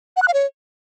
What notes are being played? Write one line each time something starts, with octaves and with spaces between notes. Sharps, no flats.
F#5
F#6
F5
C#5